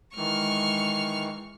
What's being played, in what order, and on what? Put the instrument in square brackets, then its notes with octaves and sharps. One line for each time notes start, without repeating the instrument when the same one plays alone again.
[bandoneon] D#3 E3 [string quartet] G#3 C#6 F6